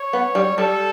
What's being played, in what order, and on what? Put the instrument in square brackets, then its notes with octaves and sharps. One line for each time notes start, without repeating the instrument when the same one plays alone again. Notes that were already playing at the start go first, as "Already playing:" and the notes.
Already playing: [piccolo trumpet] C#5
[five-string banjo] B3
G3
[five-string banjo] G3 [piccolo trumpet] A4